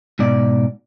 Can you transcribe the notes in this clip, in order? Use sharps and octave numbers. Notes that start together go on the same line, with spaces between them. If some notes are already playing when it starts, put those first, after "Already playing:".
G#2 B2 D5